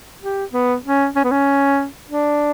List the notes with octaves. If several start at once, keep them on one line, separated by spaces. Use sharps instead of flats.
G4
B3
C#4
C#4
B3
C#4
D4